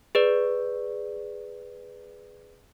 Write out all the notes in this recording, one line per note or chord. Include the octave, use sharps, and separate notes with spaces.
G#4 B4 D5